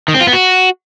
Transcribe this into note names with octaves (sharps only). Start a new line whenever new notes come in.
D#3
C4
F4
B3
F#4